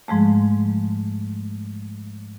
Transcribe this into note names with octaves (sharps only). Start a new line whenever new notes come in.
G#2 F3 G#3 A3